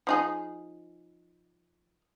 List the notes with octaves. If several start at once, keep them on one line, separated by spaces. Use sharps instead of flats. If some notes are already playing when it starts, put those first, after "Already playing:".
F3 D#4 G#4